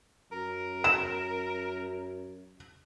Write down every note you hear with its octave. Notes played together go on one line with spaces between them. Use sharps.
F#2 A#4
E7